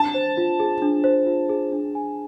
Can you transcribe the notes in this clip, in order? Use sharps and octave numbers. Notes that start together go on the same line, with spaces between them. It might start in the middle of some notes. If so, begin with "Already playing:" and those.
Already playing: D4 A5
C5
F4
G#4
D4
C5
F4
G#4
D4
G#5